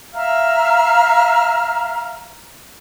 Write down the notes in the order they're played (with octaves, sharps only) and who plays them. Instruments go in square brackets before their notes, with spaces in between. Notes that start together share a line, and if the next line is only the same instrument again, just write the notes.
[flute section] E5 F5 A#5 F6